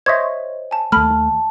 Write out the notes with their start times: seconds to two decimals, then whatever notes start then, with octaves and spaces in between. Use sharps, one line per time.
0.06 C5 C#5 D#5 E5 G#6
0.71 G#5 A5
0.92 D#2 A3 A5 B5 F6